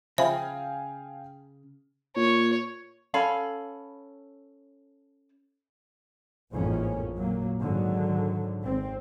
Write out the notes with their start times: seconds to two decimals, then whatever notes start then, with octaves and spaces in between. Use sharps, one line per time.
0.18 C#3 F3 E5 F5 G5 G#5 B5
2.16 A#2 C#5
3.14 C#4 A4 F5 B5
6.52 A1 F2 G#2 F3 A#3 C#4
7.16 A#2 F#3 A#3
7.60 G#2 D3 D#3 F#3
8.63 G#1 C4